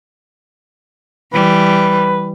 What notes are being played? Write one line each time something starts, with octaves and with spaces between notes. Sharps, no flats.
E3 G3 B4